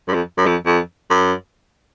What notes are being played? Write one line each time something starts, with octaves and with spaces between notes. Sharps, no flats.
F#2
F2
F#2
F2
F2
F#2